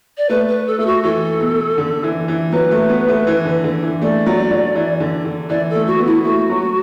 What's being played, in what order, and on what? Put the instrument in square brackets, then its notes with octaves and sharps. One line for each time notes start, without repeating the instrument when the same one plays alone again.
[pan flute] D5
[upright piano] A3 [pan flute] B4
[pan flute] B4
A4
[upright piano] A3 [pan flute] A4
[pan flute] F#4
[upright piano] E3 [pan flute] A4
[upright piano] B2
D3
E3
E3
[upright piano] F#3 [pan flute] B4
[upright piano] A3
B3
A3
E3
D3
D3
E3
[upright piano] A3 [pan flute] D5
[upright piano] F#3
F#3
E3
D3
D3
[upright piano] E3 [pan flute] D5
[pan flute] A4
[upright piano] A3
[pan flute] F#4
[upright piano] B3
[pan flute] E4
[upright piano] A3 [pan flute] F#4
[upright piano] F#3